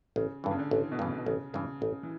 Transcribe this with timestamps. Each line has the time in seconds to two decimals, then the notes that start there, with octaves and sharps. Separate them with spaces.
0.16 A1 C#3
0.44 G2 D3 E3
0.51 C#3
0.59 D3
0.71 A1 E3
0.92 B2
0.99 G2 C#3 E3
1.18 B2
1.26 A1 C#3
1.54 G2 C#3 E3
1.81 A1 C#3
2.03 E3